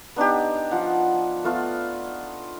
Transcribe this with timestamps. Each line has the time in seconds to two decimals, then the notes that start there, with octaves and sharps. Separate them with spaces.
0.16 B3 D4 D#4 G4
0.71 F3 F#5
1.44 A3 B3 F4